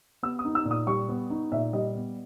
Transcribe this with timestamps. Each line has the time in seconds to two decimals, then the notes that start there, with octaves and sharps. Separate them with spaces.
0.23 B3 E6
0.39 D#6
0.45 D#4
0.55 E6
0.65 A#2
0.71 D#6
0.87 G3 C#6
1.09 B3
1.30 D#4
1.52 A#2 E5
1.73 G3 D#5
1.95 B3